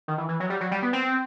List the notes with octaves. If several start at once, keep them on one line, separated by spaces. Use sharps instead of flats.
D#3
E3
E3
F#3
G3
F#3
G3
B3
C4